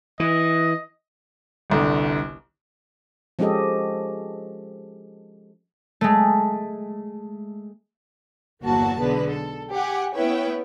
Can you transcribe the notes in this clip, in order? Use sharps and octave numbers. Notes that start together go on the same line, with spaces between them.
E3 D#5
G1 C2 D3
F3 G#3 C#4 G4 A4 D#5
G#3 A3
G1 E2 F#3 A#3 F#4 A5
B1 D3 G#3 B3 B4
A4
G4 F#5 G#5
B3 C#4 E4 B4 C#5 G5